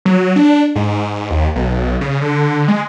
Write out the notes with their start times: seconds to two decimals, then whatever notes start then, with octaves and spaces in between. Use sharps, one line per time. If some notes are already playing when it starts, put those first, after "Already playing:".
0.05 F#3
0.36 D4
0.75 G#2
1.31 D#2
1.55 B1
2.01 C#3
2.21 D3
2.68 G#3